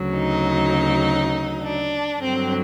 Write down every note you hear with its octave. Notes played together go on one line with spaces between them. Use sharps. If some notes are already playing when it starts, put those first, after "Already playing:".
Already playing: D2 C#3 F#3
D#4
D4
G2 D3 F#3 C4